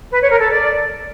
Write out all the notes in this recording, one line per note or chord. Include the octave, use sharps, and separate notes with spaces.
B4
C#5
A#4
A4
D5